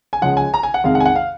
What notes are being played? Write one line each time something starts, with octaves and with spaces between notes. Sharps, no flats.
G#5
C#2 C#3 F3 G#3 F#5
G#5
A#5
G#5
F#5
F2 C3 D#3 G#3 F5
F#5
G#5
F#5
F5